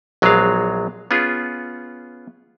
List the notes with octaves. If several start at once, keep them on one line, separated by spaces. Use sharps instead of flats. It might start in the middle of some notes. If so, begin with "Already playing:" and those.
A#1 F#3 G#3 B3 G#4 F5
B3 C#4 F4 G#4